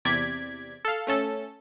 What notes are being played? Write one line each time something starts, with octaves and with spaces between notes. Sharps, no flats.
E2 C3 D5 G#6 B6
A4 F5
A3 C#4 A4